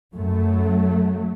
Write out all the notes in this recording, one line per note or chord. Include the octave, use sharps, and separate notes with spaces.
F#2 F#3 A3